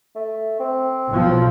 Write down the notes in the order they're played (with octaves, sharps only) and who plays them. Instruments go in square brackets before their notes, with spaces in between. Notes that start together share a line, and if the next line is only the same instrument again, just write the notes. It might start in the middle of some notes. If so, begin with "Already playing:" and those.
[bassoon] A3
C4
[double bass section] B1 F3